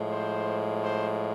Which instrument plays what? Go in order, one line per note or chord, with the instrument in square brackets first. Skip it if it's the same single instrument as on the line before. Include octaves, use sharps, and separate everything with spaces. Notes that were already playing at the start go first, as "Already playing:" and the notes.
Already playing: [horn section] A2 F3 G#3
C5
C5